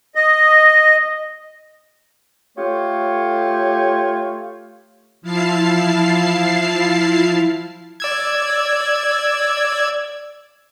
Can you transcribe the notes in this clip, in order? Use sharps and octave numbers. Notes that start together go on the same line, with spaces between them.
D#5
A3 F4 G4 C#5
F3 E4 F5 A5 C7
D5 E6 G#6